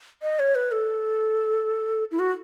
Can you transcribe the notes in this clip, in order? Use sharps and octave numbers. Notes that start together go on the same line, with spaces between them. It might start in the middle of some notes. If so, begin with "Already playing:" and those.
D#5
C#5
B4
A4
E4
F#4